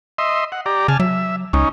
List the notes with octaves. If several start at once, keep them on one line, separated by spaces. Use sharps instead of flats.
D#5 E5 C6
F#5
G4 D5 A#5
C#3 G#5 A5 F6
F#3 E5
C#2 C#4 D#4